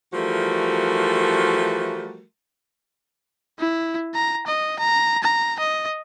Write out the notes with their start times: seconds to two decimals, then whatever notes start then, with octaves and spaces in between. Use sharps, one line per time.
0.13 E3 F3 G3 A3 F#4 A#4
3.60 E4
4.15 A#5
4.47 D#5
4.80 A#5
5.24 A#5
5.60 D#5